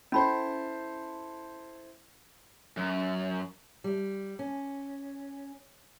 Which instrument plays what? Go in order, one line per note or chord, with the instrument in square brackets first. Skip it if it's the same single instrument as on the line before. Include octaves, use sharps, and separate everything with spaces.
[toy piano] C#4 B5 [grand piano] E4 A4 C5
[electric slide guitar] F#2
[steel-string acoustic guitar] G3
C#4